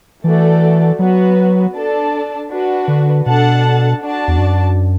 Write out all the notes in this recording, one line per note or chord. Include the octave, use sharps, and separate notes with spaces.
E3 A3 F#4 A4 D5
F#3 B3 F#4 B4
D4 A4 D5 A5
D4 F#4 B4
D3
B2 D4 A4 F#5 A5
D4 F#4 D5 A5
E2
F#2